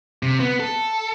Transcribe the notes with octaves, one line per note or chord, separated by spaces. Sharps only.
C3
B3
A4